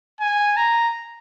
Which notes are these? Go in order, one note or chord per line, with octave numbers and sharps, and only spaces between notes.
G#5
A#5